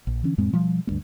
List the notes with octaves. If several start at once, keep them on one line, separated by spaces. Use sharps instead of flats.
A#1
D3 E3 C#4
F2 A2 G#3 C4
B2 F3 G3
D2 G2 A#3